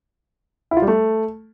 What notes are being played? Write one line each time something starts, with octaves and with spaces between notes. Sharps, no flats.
E4
F4
G3
A3